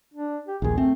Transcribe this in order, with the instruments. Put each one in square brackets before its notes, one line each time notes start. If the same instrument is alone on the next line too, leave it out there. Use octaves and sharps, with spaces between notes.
[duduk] D4
G4
[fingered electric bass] A#1 D#2 [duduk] G#4
[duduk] A3 [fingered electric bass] C4